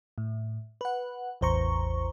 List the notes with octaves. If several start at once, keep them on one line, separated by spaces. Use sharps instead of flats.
A2
B4 F#5
A1 E2 C5 A#5 C#6